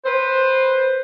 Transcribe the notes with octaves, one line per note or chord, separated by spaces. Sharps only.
B4 C5